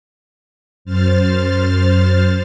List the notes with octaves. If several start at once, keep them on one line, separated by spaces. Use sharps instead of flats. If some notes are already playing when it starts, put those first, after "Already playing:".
F#2 C5 F6 A6